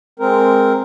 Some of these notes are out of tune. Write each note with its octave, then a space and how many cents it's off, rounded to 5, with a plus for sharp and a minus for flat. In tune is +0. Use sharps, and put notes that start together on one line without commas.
G#3 +0 C4 +0 A#4 +0